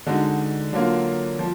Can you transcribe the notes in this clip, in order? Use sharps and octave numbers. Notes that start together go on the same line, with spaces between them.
D3 G#3 D#4 F#4
D3 F#3 A#3 F4
F3